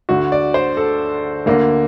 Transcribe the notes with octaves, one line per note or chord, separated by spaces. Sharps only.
D2 D3 F#4
D5
C5
A4
D2 D3 A#3